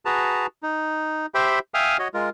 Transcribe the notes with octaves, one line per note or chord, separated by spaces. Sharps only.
F#4 G#4 B4 A5 A#5
D#4
G4 C5 E5 G5 B5
E5 F5 G5 G#5 D#6 F6
F#4 C#5 D#5
G#3 F4 A#4